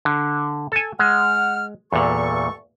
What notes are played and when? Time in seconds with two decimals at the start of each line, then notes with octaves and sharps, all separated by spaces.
0.05 D3
0.72 A4 G#5
1.00 G#3 F#5 F6
1.93 E2 G2 A#2 A4 C#6